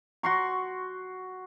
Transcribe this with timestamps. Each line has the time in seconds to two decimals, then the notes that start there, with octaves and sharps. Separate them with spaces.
0.23 F#4 C6 C#6